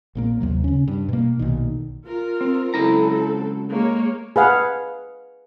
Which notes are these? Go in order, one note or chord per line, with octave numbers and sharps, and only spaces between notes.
A#1 A#2 A#3
D#2 C3 F#3
C#3 C#4
G2
B2 A#3
B1 A#2 D#3
F4 A#4
C4
C#2 F#3 C4 E4 A4 A#5
G#3 A#3 C#5
G#4 B4 F5 F#5